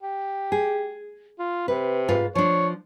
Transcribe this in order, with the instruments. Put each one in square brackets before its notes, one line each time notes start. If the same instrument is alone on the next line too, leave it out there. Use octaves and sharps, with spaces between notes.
[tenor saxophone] G4
[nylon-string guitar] G#4
[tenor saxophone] F4
[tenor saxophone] C3 [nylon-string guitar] B4
[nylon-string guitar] G#2 F4 B4
[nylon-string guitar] F3 D4 [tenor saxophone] C#5